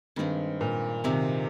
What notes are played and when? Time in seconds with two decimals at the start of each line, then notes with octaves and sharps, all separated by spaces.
0.16 G2 D#3 G#3 C4
0.61 A#2
1.04 C3 D#3 G#3 C4